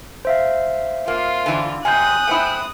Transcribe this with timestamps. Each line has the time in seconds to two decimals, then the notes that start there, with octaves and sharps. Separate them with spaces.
0.25 C5 E5 F5
1.08 A#3 F4
1.46 D3 E3
1.85 F#2 C3 G#5 D#6 F#6 G6
2.27 A3 C4 E4